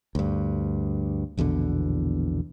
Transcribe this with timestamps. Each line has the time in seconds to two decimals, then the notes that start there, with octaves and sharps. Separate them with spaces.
0.15 D2 G2
1.37 A#1 E2 B2 D3